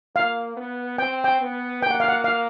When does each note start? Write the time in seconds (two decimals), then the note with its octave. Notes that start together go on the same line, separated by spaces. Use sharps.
0.15 A#3 F5
0.57 B3
0.98 C4 G5
1.24 G5
1.41 B3
1.82 A#3 G5
1.91 F#5
2.00 F5
2.08 F#5
2.24 F5